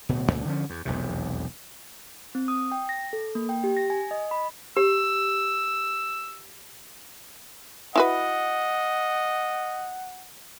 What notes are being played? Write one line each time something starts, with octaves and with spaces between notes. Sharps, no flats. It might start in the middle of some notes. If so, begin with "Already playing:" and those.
D1 B2
C#2 A#2
D3 F3 C#4
E2
E1 B1 F2 C3
C4
D#6
G5
A#6
A4
A#3
G5
G4
A#6
G#5
D#5
B5
G4 E6
E4 F#4 B4 D#5 F#5